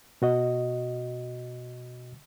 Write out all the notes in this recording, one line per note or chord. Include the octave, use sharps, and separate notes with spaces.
B2 F#4 D#5